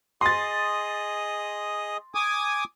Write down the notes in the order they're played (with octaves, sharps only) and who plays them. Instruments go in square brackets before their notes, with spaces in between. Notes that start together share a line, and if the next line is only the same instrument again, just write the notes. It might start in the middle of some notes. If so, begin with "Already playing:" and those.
[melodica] G#4 D#5 D#6 [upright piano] C6 A6
[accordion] G#5 D6 D#6